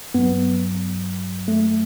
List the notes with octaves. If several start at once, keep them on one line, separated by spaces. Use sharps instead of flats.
G2 F#3 B3
A3